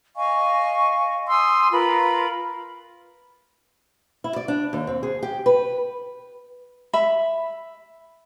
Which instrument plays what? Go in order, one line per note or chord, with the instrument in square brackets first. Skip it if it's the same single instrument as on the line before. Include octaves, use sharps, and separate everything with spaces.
[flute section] D#5 F5 G#5 C#6
G#5 C6 D#6 E6
F4 A#4 B4 B5
[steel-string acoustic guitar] E4
D5
D4
D#2
C4
G#4
G4
B4
[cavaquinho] E5 B5